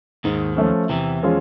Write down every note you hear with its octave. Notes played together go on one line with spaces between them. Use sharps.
D#2 G#2 D#3
F3 A3 C#4
E2 C3 E3
F3 G#3 C#4 F4